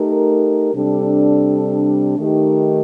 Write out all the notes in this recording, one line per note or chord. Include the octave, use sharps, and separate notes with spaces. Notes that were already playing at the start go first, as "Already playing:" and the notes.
Already playing: A3 D#4 G4 A#4
C3 G3 D4 A4
D#3 A3 D#4 G4 A#4